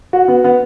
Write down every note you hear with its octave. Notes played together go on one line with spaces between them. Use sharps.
F#4
B3
B3